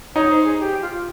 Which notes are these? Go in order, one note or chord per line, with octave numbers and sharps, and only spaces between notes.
D#4 C#5
C5
G#4
G4
F4